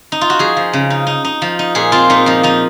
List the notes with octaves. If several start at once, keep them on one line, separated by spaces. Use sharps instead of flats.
D#4
F4
F#4
F3 G#4
F3
C#3
D#4
D#4
D#4
F3
D#4
A#2 G#4
C4 F4
A#2 D#4
F3 D#4
F3 D#4